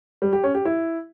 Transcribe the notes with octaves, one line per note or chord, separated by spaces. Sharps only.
G3
G4
C#4
G4
E4